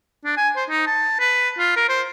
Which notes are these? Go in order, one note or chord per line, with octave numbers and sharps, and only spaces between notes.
D4
G#5
C5
D#4
A5
B4
F4
A#4
C5